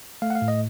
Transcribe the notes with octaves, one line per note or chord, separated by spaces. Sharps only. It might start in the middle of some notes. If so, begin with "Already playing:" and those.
A3 F5
F#5
F5
A2
D#5